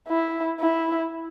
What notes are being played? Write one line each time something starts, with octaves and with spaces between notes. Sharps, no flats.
E4
E4